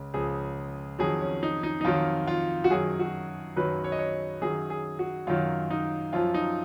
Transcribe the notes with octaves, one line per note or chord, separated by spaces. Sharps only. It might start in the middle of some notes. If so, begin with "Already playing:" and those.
Already playing: C#2 C#3
C#2 C#3 F3 G#4
F2 D#3 F#3 G#4
C#4
D#4
D#4
D#4
F2 D#3 F#3 F4
F4
F#4
F#2 D#3 F#3 G#4
F#4
F#2 D#3 F#3 B4
C#5
D#5
C#5
F#2 D#3 F#3 G#4
G#4
F#4
F#2 D#3 F#3 F4
D#4
F#2 F3 F4
D#4